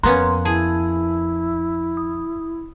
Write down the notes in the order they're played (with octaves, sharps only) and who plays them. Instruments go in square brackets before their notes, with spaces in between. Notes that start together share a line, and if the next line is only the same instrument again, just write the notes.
[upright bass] F2 [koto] A#3 B3 C#4 [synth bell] A#5 C6 F#6
[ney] E4 [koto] G#4 [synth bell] A5
[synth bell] D#6